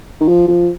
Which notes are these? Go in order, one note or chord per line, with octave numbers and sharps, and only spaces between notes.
D#3
F3
F3